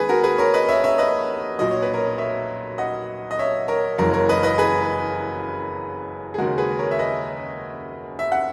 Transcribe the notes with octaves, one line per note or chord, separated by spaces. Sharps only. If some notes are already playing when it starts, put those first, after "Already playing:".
Already playing: D#2 D#3 G#3 G#4 B4
F#4 A#4
G#4 B4
A#4 C#5
B4 D#5
C#5 E5
C#5 E5
B4 D#5
B1 A#2 F#3 D#5
C#5
B4
A#4 C#5
C#5 E5
D#5 F#5
D#5
C#5 E5
A#4 C#5
F#1 F#2 E3 G#3 A#4 C#5
A#4 C#5
B4 D#5
B4 D#5
G#4 B4
G#4
D#2 C#3 G#3 F#4 A#4
G#4 B4
A#4 C#5
E5
B4 D#5
E5
F#5